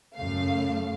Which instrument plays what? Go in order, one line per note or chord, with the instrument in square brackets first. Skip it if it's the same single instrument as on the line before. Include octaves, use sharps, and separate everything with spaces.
[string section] F#2 C#3 A3 F5